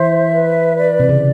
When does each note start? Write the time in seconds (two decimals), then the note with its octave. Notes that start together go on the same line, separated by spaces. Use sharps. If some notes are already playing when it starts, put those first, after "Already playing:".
Already playing: E3 C5 E5
0.33 B4
0.75 D5
1.00 C3
1.09 C#3